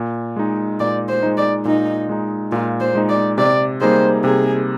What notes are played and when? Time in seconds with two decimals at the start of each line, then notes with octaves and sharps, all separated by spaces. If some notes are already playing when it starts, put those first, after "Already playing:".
Already playing: A#2
0.36 G#3 D#4
0.80 A#2 D5
1.08 C5
1.23 G#3 D#4
1.37 D5
1.65 A#2 D#4
2.09 G#3 D#4
2.52 A#2 F4
2.80 C5
2.95 G#3 D#4
3.09 D5
3.38 C3 D5
3.81 G3 A#3 D#4 G#4 C5
4.24 C3 G#4